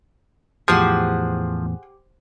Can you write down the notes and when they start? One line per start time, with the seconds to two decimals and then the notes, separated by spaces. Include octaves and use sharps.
0.68 E2 A2 F3 G4 G#4 C5 F#5